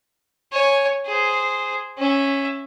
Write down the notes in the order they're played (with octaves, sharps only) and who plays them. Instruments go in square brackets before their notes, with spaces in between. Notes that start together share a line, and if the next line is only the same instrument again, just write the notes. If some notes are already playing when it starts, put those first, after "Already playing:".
[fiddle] C#5 G#5
G#4 C5
C#4 E5